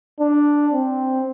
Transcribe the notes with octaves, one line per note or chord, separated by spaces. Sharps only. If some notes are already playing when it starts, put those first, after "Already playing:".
D4
C4